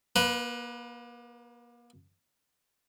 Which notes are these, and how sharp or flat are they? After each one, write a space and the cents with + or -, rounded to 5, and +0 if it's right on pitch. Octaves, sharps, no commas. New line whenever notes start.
A#3 +35 B4 +0